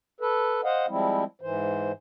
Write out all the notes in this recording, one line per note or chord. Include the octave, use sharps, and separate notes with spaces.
A4 B4
C5 D#5 F5 F#5
F3 G3 G#3 C4 E4
G#2 E3 C5